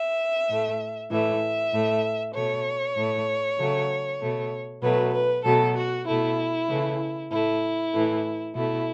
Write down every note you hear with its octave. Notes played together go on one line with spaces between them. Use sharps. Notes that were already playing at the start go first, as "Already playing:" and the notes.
Already playing: E5
A2 A3
A2 E3 A3 E5
A2 A3
B2 A3 C#5
A2 A3
C#3 F#3 A3
B2 A3
B2 F#3 A3 B4
B4
B2 F#3 A3 A4
F#4
B2 A3 E4
C#3 E3 A3
A2 A3 E4
A2 E3 A3
B2 A3 E4